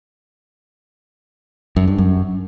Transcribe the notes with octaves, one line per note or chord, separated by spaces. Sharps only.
F#2
G2
F#2